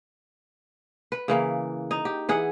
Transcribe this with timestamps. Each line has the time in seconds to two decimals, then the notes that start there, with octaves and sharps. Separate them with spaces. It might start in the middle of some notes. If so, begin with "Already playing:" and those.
1.12 B4
1.28 C#3 E3 A#3
1.91 D#4
2.05 G4
2.29 E3 G#4 F#5